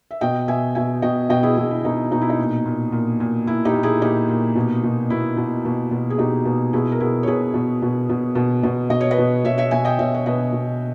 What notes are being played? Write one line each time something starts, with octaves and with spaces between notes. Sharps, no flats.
E5
B2 D#5 G5
B2 E5 G#5
B2 E5 G#5
B2 D#5 G5
B2 D#5 G5
E4 G#4
B2 E4 G#4
E4
B2 D#4
B2 D#4
E4
D#4
A#2
A#2
A#2
A#2
A#2 E4
D#4 G4
A#2
E4 G#4
A#2 D#4 G4
A#2
B2
B2
B2 E4
B2
B2
B2
G#4
B2 D#4 G4
B2
B2 E4 G#4
A#4
B2 E4 G#4
C#5
B2 G#4 B4
B2
B2
B2
B2
B2
B2 D#5
C#5
B4 D#5
B2
B2 C#5 E5
C#5 E5
B2 E5 G#5
D#5 G5
B2 C#5 E5
C#5
B2 B4 D#5
B2